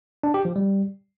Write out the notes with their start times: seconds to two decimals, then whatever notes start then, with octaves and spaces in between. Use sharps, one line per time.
0.23 D4
0.34 G4
0.45 F3
0.56 G3